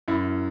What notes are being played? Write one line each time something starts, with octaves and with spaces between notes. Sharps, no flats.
F#2 E4